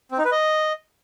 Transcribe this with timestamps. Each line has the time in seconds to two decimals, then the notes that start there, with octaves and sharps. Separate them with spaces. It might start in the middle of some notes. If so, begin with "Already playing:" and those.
0.11 C4
0.18 D#4
0.25 B4
0.32 D#5